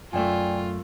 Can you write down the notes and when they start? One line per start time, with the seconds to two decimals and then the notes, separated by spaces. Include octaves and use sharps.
0.13 F#2 A3 F4 D5 G5 G#5